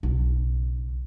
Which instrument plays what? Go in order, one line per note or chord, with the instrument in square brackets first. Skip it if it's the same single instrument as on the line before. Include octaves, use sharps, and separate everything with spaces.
[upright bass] B1 C#3